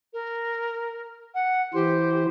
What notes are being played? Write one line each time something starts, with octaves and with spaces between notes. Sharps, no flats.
A#4
F#5
E3 G4 C5